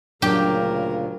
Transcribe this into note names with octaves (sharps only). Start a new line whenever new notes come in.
D2 A#2 C#3 F#3 D4 G4 A#4